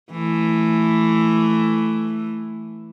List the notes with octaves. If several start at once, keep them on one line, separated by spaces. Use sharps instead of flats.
E3 A3